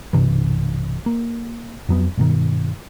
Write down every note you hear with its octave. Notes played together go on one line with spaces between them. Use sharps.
B1 G2 C3 E3
A#3
F2 F#3 B3
G2 B2 D#3